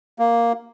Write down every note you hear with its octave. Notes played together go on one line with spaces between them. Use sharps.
A#3